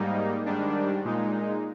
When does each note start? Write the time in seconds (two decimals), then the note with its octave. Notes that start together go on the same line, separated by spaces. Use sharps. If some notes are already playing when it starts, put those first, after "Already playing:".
Already playing: G#2 G3 A#3 D#4
0.46 G#2 D#3 G3 D4
1.05 A#2 G#3 D#4